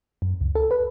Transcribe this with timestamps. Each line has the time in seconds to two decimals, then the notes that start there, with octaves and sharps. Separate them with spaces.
0.22 F#2
0.41 C#2
0.55 A4
0.71 B4